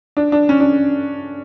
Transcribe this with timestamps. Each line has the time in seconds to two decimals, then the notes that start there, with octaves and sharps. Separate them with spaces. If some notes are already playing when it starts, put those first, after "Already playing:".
0.17 D4
0.32 D4
0.49 C#4
0.60 D4